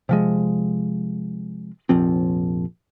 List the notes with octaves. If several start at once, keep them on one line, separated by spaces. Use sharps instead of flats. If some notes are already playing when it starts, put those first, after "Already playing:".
C3 F3 G#3
F1 A#1 F3 C4